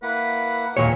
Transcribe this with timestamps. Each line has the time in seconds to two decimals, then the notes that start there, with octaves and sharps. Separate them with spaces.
0.03 A#3 E4 B4 F#5
0.77 D#2 A#2 C#5